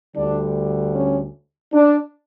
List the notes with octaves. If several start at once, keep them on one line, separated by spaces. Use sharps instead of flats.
D2 D3 G3 D4
C#4
D4